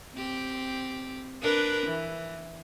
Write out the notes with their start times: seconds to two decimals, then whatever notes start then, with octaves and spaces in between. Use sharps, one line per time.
0.15 C4 G4
1.42 D4 A#4 B4
1.87 E3